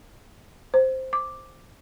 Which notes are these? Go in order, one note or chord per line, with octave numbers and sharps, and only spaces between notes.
C5
D6